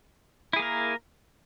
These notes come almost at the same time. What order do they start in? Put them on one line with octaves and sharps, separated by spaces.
E4 G#4 A#3 A#4